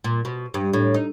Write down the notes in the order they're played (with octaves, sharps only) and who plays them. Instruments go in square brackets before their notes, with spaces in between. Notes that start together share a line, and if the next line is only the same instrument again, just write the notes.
[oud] A#2
B2
G2
A2
D#4